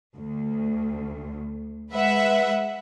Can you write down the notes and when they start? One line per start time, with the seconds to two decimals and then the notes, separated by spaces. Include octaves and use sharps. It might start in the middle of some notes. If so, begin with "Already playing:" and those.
0.16 D2
1.91 G#3 B4 E5 F#5